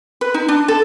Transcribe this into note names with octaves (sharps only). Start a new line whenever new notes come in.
B4
D#4
D4
A4